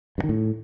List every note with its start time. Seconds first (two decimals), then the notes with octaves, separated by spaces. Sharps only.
0.18 G2
0.24 D#3
0.29 A2